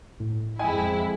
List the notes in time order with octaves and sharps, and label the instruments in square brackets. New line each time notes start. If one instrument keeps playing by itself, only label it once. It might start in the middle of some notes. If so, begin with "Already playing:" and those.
[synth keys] A2
[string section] F2 G#3 E4 [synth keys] D#5 G5 [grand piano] G#5